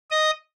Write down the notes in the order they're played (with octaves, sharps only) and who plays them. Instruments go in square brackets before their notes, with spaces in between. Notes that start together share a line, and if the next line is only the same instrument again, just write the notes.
[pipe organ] D#5 D#6